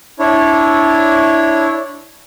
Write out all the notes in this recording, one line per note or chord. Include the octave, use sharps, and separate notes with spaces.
D4 E4 C#5